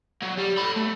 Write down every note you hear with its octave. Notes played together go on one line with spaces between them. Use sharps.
F#3
G3
A4 B5
A3